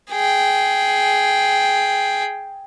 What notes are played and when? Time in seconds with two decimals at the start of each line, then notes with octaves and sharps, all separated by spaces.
0.12 G#4 G5